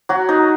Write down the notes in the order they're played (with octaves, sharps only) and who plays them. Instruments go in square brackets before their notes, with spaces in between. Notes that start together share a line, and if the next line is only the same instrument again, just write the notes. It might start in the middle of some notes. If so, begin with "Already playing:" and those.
[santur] F#3 F#4
D#4